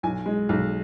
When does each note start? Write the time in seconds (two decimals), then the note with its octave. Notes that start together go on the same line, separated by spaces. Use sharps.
0.03 B1 G#5
0.26 G#3
0.49 B1